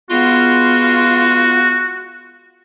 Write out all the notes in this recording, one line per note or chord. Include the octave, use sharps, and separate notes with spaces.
G#3 B3 F4 F#4